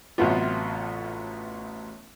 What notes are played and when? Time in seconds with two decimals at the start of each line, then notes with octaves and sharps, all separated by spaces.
0.18 A1 A2 C3 F#3 B3 F4